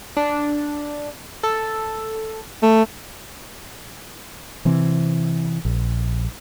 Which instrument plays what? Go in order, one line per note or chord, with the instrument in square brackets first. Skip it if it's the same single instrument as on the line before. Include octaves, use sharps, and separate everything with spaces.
[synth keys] D4
A4
[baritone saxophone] A3
[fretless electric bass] C3 E3 C4
A#1